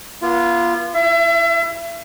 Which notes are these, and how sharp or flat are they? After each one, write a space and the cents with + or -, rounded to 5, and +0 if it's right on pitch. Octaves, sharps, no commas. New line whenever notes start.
B3 -40 F4 -20
E4 +0 E5 +35